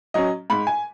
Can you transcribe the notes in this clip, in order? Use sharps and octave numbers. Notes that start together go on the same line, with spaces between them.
F#3 C#4 D#5
G#2 B5
G#5